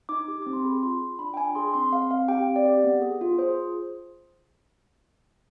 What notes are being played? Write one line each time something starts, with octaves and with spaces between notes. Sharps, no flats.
D#4 D6
G4
C4 D6
C6
G#4 B5
F4 C6
F4
D4 B5
G5
D4 G#5
G#4 C6
C4 C6
C4 F5
C4 F5
G4 G5
C4
D5
G4
B3
G#4
F4
G#4 C5